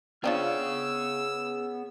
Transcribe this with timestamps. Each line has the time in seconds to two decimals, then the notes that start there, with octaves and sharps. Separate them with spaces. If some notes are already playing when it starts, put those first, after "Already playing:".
0.24 B3 C4 D4 F4 G#4 C#5 E6